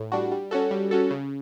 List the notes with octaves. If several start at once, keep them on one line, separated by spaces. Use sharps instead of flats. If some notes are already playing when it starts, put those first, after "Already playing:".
Already playing: A2
G3 D4 F#4
G3
C#4 F#4 A4
G3
C#4 F#4 A4
C#3